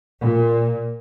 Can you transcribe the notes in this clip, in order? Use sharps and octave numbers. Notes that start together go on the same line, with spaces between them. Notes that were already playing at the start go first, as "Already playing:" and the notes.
A#2